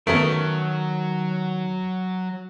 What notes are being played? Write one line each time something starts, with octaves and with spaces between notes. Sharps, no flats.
D#3 F#3 A3 B3 C#4 A#4